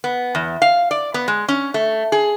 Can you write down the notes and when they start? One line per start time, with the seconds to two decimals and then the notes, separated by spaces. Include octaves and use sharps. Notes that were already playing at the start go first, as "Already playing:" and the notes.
0.04 B3
0.35 E2
0.62 F5
0.91 D5
1.14 B3
1.28 G#3
1.48 C#4
1.74 A3
2.12 G#4